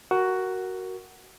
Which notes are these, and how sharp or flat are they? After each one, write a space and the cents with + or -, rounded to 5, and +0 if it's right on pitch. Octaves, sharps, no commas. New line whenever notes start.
F#4 +10 A#4 +0